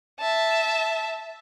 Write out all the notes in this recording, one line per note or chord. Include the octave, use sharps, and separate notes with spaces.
E5 A5